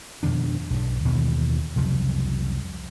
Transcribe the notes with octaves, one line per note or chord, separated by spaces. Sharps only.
F2 B2 D#3 D4
B1 G2
D#2 B2 D#3 E3
C2 F2 C#3 F#3